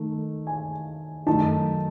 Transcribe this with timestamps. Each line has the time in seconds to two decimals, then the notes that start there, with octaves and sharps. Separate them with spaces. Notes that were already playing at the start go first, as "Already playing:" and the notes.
Already playing: D#3 A3 D#4
0.47 G#5
1.26 F#2 D#3 A3 D#4 A5